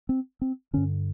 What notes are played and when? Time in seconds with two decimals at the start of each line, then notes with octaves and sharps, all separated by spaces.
0.09 C4
0.41 C4
0.73 G2 D3 C#4